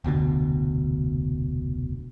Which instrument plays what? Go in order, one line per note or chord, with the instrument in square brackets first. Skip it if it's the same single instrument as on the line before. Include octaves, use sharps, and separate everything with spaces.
[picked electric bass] F1 D2 B2 D3